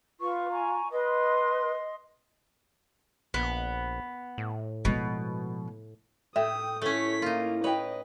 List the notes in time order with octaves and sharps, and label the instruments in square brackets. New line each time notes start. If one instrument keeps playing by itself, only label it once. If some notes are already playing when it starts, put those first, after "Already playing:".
[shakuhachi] F4 [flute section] B4 C#6
[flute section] G#5 A#5 C#6
[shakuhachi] B4 [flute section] D#5 C6 D#6
[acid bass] A#1 [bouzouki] B3
[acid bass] A2
[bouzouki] B2 [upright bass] F3 G#3
[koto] A2 [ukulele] E5 [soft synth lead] G5 [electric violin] D#6
[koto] A3 C#4 [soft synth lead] E4 [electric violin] C#5 B6
[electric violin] A#3 [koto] D#4 F4
[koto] B4 [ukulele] C#5 G5 [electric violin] D#5